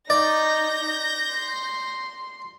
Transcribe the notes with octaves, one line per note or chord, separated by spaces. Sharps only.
D#4 D5 G6 A#6
C6